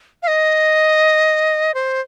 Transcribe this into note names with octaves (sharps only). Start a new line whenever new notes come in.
F5
D#5
C5